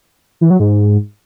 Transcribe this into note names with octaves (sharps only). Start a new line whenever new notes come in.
E3
F#3
G#2